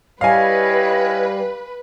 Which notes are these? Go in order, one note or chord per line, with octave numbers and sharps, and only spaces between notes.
G3 E4 B4 C#5 D#5 F5 G#5